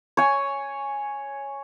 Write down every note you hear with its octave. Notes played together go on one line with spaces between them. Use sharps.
C#5 G#5